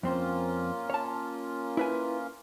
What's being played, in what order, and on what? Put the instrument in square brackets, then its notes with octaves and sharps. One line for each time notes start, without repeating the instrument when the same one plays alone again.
[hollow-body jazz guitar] F2 C4 C5 [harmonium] A#3 C#4 F4
[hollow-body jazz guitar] C#5 A5
E4 B4 G#5